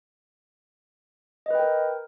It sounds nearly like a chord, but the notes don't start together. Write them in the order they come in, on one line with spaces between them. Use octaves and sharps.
D#5 B4 G5 A#4